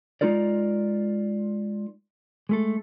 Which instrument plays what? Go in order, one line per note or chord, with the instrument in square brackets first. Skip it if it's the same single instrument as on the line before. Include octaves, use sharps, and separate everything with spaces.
[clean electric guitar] G#3 D#4 F4 A#4 D5
G#3 A3 A4